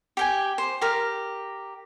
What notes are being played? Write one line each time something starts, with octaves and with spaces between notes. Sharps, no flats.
G4 G5 G#5
C5
G4 A#4